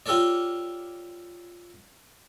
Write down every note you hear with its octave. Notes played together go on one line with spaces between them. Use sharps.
F4 G4 A4 A#4 C#5 D5